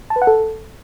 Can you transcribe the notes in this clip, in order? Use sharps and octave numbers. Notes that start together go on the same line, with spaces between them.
A5
B4
F#5
A4